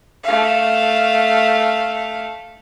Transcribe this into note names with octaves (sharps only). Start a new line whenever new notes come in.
A3 F5